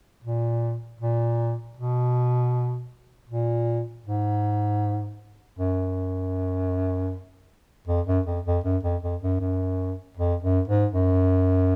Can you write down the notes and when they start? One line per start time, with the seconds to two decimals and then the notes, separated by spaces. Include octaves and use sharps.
0.24 A#2
1.01 A#2
1.77 B2
3.29 A#2
4.06 G#2
5.59 F#2
7.88 F2
8.07 F#2
8.26 F2
8.46 F2
8.64 F#2
8.83 F2
9.03 F2
9.22 F#2
9.40 F#2
10.17 F2
10.43 F#2
10.68 G#2
10.94 F#2